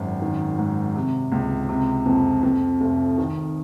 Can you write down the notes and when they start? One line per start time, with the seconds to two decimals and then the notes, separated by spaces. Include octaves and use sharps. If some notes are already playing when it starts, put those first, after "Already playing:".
Already playing: G#1 F#2
0.22 D#3
0.58 G#2
0.96 C3
1.32 C#2
1.69 C3
2.06 F2
2.43 F2
2.81 F1
3.18 D#3